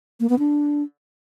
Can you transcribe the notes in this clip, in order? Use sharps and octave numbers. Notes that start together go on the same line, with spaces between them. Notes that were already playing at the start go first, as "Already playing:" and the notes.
A#3
B3
D4